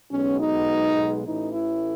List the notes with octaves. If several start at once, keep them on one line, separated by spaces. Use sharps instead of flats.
B1 B2 G#3 B3 C#4
D#4
A1 A2 E3 D#4
E4